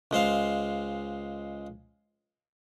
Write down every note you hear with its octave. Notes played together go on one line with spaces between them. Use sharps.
C#2 G#3 C5 F5